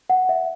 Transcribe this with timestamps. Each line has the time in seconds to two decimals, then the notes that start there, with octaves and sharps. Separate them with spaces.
0.10 F#5
0.29 E5